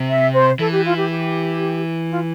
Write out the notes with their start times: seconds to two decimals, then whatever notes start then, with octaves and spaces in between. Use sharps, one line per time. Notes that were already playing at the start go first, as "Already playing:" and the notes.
Already playing: C3
0.09 E5
0.34 C5
0.59 E3 A4
0.72 G4
0.84 F4
0.97 G4
1.10 G4
2.10 F4